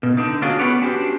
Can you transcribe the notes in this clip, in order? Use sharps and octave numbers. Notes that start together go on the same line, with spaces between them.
B2
D3 D4 D#4
C#4 D4 F4 F#4 G#4
B3 B4 C#5 D5
C#4 D4 F#4 G4 C5